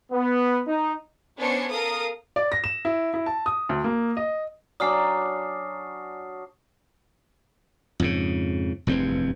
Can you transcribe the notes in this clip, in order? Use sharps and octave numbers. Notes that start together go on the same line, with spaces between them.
B3
D#4
B3 C#4 D4 C5 C#5 C#7
A4 A#4 F5 D#6
D5
A#6
E7
E4
E4
A5
D#6
D2
A#3
D#5
F#3 D4 D5 G#5 D6 D#6 F6 C7
F2 G#2 C#3
F1 E2 G2 C4